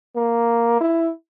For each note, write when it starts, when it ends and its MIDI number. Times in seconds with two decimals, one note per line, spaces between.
0.16 0.80 58
0.81 1.10 64